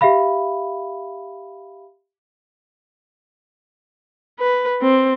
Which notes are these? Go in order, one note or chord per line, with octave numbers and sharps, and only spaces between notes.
G4 E5 F5 B5
B4
C4